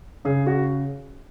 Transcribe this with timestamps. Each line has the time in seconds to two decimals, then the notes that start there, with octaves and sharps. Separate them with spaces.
0.25 C#3 G#4
0.47 F#4